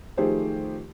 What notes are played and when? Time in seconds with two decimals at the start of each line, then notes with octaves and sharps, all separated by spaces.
0.17 D#3 F3 A3 G4 G#4 C5